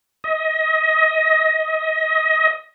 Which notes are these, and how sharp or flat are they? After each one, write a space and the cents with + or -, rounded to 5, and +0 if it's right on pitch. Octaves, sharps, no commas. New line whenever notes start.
D#5 +25